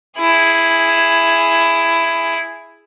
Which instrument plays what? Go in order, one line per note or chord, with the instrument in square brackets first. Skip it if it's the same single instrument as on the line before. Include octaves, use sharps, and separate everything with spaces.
[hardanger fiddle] E4 G#4